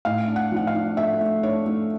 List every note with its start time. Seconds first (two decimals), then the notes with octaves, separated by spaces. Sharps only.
0.05 A2 F5
0.28 D4
0.36 F#5
0.52 F3 F#5
0.67 F5
0.75 D4
0.97 A3 E5
1.21 A3
1.43 D4 C#5
1.66 A3